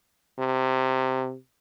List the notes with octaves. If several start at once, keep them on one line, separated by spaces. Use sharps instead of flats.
C3